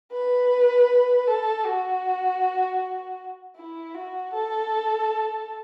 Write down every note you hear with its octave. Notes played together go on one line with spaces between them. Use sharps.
B4
A4
F#4
E4
F#4
A4